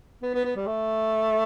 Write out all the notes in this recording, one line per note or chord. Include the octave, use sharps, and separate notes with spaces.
B3
B3
B3
G3
A3